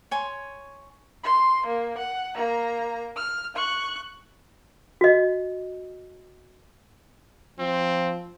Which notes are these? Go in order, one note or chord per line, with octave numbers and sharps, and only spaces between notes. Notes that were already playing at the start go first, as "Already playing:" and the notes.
C#5 G#5 C6
C6
A#3
F#5
A#3 A#5
F6
C#6 F#6
F#4 D#5
F3 C4